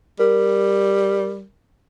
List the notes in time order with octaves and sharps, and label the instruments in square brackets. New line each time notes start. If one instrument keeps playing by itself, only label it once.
[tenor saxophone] G3 [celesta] A#4